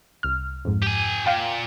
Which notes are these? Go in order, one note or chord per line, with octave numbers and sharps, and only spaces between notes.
C2 F6
F2 G#2
G4 G#5
A#2 F5 G5